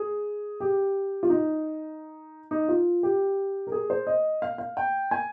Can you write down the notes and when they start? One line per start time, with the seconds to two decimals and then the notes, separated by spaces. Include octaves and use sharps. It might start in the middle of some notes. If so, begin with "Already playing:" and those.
Already playing: G#4
0.60 G4
1.23 F4
1.30 D#4
2.51 D#4
2.69 F4
3.03 G4
3.67 A#4
3.72 G#4
3.90 C5
4.07 D#5
4.42 F5
4.58 F5
4.77 G5
5.11 G#5